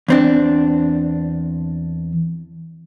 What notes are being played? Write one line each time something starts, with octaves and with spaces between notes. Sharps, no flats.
E2 C4 D4